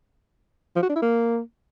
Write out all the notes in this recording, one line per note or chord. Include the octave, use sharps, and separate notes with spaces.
F3
F#4
D4
E4
A#3